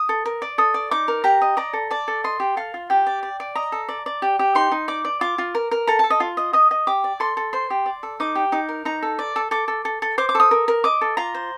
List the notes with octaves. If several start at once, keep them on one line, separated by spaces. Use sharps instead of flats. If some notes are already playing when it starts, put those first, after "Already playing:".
Already playing: D#6
A4
A#4
D5
A4 D#6
D5
D#4 D6
A#4
G4 A#5
D#5
D5 A#5
A4
D5 A5
A4
D#5 C6
G4
A4 F5
F4
G4 G5
D5
D5
D5
D#5 A#5
A4
D5
D5
G4
G4
D#4 C6
D#4
D5 D6
D5
F4 D6
F4
A#4
A#4
A4 A#5
A4 A5
D#5
F4
D#5
D#5 D#6
D#5
G4 D6
D5
A4 C6
A4
C5 C6
G4
D5
A4
D#4 D6
G4
D#4 D6
A#4
D#4 A#5
A4
D5
A4
A4 D6
A4
A4
A4
C5 D6
D6
A4 D#6
A#4
A#4
D#5 D6
A4
F4 A#5
C5